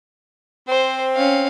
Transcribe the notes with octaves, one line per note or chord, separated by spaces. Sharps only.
C4 C5
C#4 F5